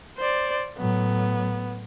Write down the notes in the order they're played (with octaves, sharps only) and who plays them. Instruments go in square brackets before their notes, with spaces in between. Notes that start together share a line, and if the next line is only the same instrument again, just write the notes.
[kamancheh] C5 D5
[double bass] A2 F#3 [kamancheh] B3